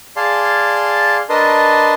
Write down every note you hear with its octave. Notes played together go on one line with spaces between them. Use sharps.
G#4 D5 F5 A5 C6
D4 A#4 B4 D#5 A5 C6